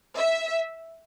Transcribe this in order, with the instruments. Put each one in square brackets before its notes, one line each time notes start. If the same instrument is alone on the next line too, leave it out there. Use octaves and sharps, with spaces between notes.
[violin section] E5